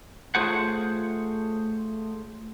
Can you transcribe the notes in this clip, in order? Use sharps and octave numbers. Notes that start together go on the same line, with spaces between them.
A3 F4 G#4 C5 C#5 F#5